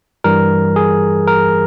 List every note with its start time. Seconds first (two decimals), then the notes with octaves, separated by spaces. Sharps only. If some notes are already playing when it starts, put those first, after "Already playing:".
0.24 G2 E3 G3 A#4
0.76 G#4
1.28 A#4